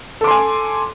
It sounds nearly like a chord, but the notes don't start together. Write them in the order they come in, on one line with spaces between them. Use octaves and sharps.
A4 D6 C6 G#5